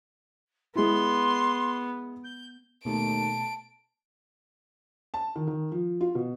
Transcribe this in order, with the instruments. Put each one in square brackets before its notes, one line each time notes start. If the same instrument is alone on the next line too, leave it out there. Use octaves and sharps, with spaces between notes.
[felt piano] G#3 E4 [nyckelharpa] B3 [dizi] C6
[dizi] G6
[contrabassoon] D#2 [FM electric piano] B2 A3 [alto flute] A5 [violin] D7
[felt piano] A5
D#3
D#3
F3
F4
B2